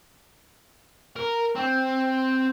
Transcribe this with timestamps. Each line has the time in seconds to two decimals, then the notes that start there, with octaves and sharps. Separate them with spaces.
1.16 A#4
1.55 C4